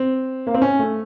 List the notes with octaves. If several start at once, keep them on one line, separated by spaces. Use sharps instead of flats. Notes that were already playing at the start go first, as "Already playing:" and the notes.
Already playing: C4
A#3
C4
C#4
A3